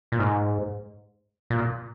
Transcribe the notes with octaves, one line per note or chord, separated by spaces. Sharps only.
A#2
G#2
A#2